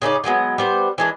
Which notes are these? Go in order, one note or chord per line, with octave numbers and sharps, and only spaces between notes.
C#3 C#4 D#4 D5
D3 F#3 G#3 B3
G3 B3 C5
E3 G#3 D4